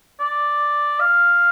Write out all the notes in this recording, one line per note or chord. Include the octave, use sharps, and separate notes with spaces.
D5
F5